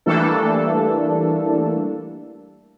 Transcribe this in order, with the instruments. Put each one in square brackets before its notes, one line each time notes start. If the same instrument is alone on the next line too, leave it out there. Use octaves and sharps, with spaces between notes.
[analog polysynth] E3 G3 A3 A#3 D4 A4